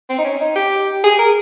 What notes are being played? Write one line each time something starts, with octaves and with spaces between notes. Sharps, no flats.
C4
D#4
C#4
D#4
G4
G#4
A#4